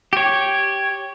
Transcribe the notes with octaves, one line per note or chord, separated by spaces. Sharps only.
G4 C#5